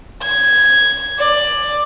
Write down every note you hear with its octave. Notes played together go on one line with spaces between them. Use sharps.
G#6
D5